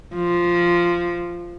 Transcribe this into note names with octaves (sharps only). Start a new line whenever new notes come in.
F3